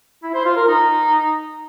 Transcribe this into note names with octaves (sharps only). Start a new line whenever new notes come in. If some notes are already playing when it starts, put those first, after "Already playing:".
E4
C5
F4
A#4
D#4